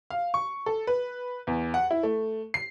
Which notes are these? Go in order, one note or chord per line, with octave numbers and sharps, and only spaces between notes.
F5
C#6
A4
B4
E2
F#5
E4
A3
C7